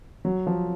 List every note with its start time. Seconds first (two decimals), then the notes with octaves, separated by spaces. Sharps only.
0.25 F#3
0.47 F3